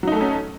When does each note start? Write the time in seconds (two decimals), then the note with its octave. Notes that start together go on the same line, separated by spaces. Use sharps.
0.03 F#3
0.07 D#4
0.12 A3
0.16 A4
0.21 C#4